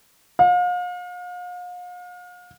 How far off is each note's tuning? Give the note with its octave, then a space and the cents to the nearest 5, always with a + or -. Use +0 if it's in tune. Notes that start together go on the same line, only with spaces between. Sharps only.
F5 +40